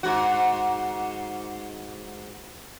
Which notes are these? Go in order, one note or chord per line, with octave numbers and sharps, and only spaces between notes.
G#2 F#4